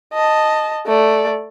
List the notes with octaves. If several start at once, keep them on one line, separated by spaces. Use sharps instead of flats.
D#5 A5
A3 D5